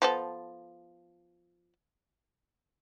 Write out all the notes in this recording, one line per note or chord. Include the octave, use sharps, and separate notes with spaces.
F3 B3 A4